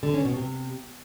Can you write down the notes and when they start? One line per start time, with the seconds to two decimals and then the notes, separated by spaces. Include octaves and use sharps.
0.03 D3
0.14 C#4
0.25 B2
0.36 C3